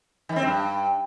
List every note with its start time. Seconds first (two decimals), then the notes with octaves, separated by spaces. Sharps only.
0.29 D#3
0.36 C4
0.43 G2